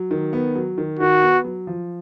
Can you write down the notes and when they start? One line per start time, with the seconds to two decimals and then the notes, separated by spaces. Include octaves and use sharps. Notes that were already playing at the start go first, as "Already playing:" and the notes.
Already playing: F#3
0.11 D#3
0.33 B3
0.56 F#3
0.78 D#3
0.99 D#3 F#4
1.22 B3
1.44 F#3
1.67 F3